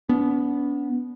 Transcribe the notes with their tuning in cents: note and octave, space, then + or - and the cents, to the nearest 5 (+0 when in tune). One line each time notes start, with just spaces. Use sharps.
B3 +0 D4 -40